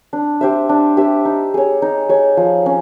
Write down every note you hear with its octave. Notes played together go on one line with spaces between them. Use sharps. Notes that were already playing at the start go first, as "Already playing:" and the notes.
D4
G4 C5 E5
D4
G4 C5 E5
D#4
G#4 C#5
D#4
G#4 C#5
F3
C#4